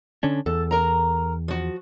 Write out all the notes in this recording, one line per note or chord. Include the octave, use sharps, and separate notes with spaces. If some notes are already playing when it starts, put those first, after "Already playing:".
D3 C#4 D4
E2 A4
A#4 A#5
F3 F#4